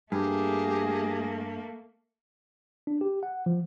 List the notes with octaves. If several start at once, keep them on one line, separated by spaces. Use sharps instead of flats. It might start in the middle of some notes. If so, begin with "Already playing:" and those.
G2 A3 A#3 G4 G#4
D4
G4
F#5
F3